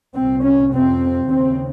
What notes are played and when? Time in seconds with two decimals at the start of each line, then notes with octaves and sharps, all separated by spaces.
0.14 C2 A#2 C4
0.43 C#4
0.72 F2 C3 C4
1.29 D#2 C#3 C4